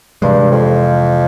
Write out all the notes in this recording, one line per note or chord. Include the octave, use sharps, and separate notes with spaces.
G2 C3 E3 G#3
F2